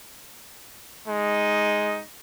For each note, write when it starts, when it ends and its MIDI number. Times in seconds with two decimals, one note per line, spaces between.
1.08 2.02 56
1.08 2.03 63